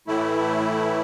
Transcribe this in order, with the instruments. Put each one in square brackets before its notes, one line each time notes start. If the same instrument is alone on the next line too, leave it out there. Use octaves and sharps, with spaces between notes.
[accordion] A2 E3 A3 E4